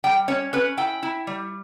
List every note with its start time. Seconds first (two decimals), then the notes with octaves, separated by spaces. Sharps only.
0.04 G3 G5
0.28 C#4 C#5
0.53 C#4 B4
0.77 E4 G5
1.03 E4
1.27 G3